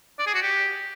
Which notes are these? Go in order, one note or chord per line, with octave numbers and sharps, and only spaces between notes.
D5
G#4
F#4
G4